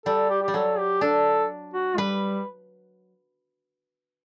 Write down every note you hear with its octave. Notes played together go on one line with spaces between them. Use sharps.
G3 A4
G4
G4
G3
F#3 A4
G4
D4 A4
F#4
G3 B4